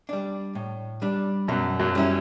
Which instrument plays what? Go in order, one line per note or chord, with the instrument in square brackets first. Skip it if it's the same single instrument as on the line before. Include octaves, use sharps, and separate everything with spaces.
[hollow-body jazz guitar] G3 D4
A2
G3 D4
[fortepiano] F#2 F#3 [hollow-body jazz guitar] B2
[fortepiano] F#2 F#3
[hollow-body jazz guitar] G3 C#4 E4